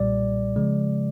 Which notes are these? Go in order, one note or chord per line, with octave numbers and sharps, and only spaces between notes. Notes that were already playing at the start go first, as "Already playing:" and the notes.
Already playing: B1 A#2 G3 D5
C#3 F3 G#3